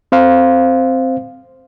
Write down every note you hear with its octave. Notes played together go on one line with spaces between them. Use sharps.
C4 C5 F5